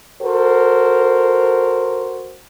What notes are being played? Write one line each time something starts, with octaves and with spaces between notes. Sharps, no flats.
F#4 A4 A#4 C5